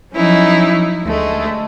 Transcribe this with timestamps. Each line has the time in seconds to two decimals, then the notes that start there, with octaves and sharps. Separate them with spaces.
0.13 F3 F#3 C#4 D#4 E4
1.03 D2 G#3 A3